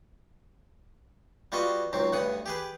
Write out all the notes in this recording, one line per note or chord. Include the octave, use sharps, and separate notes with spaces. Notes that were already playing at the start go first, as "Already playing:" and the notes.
G3 B3 F4 F#4 D#5
C#2 G#2 F#3 C4
D2 G2 B3 F#5 D#6
G4 G#4 B4